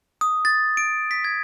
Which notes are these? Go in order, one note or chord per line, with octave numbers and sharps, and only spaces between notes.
D#6
A6
D7
B6
G#6